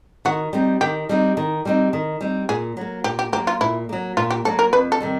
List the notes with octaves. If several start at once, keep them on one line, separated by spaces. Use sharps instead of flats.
D#3 F#4
G3 C4 D#4
D#3 G4
G3 C4 D#4
D#3
G3 C4 D#4
D#3
G3 C4 D#4
A#2 G#4
F#3 A#3
A#2 G4
G4
F#3 A#3 G4
F4
A#2 E4
F#3 A#3
A#2 F4
G4
F#3 A#3 A4
A#4
F2 B4
A4
C3 D#3 G3